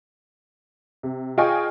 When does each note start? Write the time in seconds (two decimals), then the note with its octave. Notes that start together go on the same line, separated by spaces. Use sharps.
1.03 C3
1.38 F4 G#4 D#5 G5 G#5 C#6